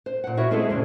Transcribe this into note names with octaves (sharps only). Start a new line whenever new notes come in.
C5
A#2 F#5
E4 F#4 A#4 C#5
G#3 A3 C4 E4 G#4 A4
F2 A#2 C#3 D4